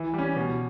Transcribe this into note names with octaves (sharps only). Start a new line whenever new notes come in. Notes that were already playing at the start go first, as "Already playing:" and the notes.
Already playing: E3
G3 C#4
B2